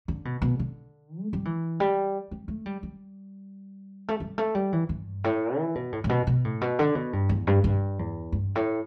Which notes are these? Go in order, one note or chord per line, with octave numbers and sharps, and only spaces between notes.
D3
B2
B2
D3
A3
G3
E3
G3
G3
A3
G3
G3
A3
G3
A3
G3
E3
G2
A2
E3
B2
A2
A2
B2
B2
A2
B2
D3
B2
G2
E2
G2
G2
E2
G2
A2